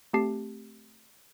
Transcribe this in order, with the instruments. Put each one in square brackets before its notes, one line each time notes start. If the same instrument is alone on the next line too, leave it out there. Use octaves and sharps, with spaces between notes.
[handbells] A3 C4 G4 A5 C7